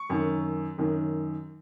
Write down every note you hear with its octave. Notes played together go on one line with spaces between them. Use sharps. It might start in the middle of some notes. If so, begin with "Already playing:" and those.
Already playing: C#6
F#2 D#3
F#2 D#3